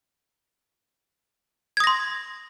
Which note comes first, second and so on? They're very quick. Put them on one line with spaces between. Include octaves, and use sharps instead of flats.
G#6 D#6 A#6 C6